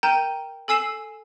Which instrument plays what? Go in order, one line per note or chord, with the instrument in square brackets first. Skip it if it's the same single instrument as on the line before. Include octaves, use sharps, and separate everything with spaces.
[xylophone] A#4 G5 A#5 G6 D#7 E7
A4 G#5 E6 C7 E7